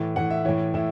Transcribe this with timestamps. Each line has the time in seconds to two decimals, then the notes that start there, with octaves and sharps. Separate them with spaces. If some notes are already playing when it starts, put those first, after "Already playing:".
Already playing: A2 E3
0.16 A2 E3 F#5
0.30 E5
0.45 A2 E3 C#5
0.74 A2 E4